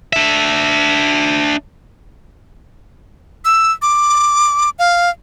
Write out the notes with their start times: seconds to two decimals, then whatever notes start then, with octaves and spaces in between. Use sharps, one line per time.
0.13 D4 E5
3.45 E6
3.82 D6
4.79 F5